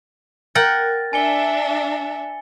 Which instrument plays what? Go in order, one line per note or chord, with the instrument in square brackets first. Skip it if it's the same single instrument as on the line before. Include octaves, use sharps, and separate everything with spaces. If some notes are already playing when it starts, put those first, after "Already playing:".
[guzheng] A#4 F#5 G5 [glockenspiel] A6
[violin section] D4 E5 [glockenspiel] G#5 C#7 G7